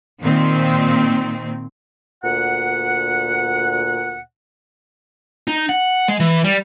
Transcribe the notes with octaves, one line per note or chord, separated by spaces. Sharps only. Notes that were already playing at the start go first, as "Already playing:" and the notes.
A#2 D#3 C4
D2 A#2 F#5
D#4
F#5
G#3
E3
G3